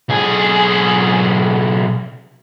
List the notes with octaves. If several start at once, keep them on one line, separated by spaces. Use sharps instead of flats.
B1 G#4